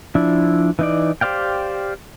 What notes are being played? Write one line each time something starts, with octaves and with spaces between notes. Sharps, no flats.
F3 D4 E4
E3 D#4 D5
G4 C5 D5 F5 G5